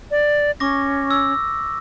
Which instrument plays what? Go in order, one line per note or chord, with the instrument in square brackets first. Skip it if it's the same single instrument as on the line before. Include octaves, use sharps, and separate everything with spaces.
[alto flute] D5
[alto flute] C#4 [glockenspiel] C#6 D6 A#6
[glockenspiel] E6